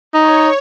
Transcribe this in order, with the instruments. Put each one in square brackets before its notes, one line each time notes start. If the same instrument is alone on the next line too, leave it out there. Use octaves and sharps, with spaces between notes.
[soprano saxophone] D#4 [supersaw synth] C#5